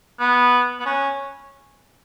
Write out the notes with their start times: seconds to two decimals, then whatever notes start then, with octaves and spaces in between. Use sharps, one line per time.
0.19 B3
0.80 B3
0.86 C#4